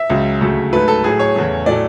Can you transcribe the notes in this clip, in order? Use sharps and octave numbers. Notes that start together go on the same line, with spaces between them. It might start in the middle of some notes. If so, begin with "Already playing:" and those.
Already playing: E5
C#2 C#3 F#3
D2 C#3 F#3 A3
G#2 F#3 A3 B4
A4
A2 F#3 A3 G#4
C#5
E2 C#3 E3 A3
A2 F#3 A3 D5